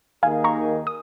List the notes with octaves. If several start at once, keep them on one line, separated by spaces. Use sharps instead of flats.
D#2 D#3 A#3 D#4 G#4 F5 G#5
A#5 C#6
D#6